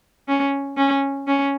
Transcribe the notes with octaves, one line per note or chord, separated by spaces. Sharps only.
C#4
C#4
C#4